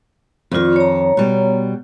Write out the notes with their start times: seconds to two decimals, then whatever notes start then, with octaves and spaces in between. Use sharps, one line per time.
0.51 F2 D#3 F4 D5
0.76 C#5 A#5
1.17 B2 G3